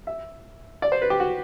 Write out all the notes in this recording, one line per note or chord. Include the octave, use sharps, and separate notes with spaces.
E5
D5
C5
B4
G4
F#4